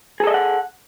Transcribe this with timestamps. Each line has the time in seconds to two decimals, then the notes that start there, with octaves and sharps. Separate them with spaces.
0.20 G#4
0.24 A4
0.27 D#5
0.31 E5
0.34 F#5